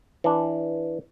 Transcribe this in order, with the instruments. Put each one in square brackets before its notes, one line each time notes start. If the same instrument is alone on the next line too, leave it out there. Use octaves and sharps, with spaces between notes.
[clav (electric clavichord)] E3 D4